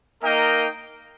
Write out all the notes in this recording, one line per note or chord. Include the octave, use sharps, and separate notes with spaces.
A#3 D#4 A#4 D#5 G5